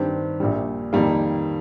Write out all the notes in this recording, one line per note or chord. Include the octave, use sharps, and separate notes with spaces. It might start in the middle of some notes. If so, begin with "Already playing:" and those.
Already playing: G2 D#3 C4 G4
A#1 A#2 G3
F2 D#3 G3 A#3